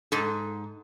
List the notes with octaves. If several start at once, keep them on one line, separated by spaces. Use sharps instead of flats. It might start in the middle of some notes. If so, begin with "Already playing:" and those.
G#2 A4